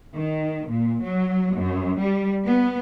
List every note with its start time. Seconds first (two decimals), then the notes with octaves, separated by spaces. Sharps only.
0.15 D#3
0.68 A#2
1.02 F#3
1.55 F#2
1.99 G3
2.44 B3